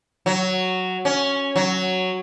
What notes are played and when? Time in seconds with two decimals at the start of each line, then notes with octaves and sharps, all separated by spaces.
0.26 F#3
1.05 C#4
1.56 F#3